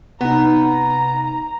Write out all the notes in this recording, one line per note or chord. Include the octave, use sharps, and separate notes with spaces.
C3 B3 D#4 A#5